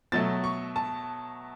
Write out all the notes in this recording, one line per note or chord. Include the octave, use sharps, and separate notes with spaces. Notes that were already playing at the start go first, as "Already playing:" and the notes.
B2 F#3 A3 A6
C#6
A5